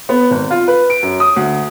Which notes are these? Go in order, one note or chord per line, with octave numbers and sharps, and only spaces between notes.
B3
G#1
F4
B4
D7
F#2
D#6
D2